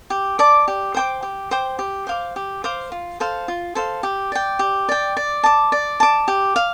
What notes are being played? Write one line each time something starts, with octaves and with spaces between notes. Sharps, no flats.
G4
D5 A5 D6
G4
C5 G5 D6
G4
C5 G5 D6
G4
C5 F5 D6
G4
C5 F5 D6
F4
A4 C5 F5
F4
A4 C5 F5
G4
D5 G5
G4
D5 G5
D5
A5 D6
D5
A5 D6
G4
F5